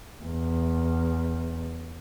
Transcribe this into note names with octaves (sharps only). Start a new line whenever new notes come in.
E2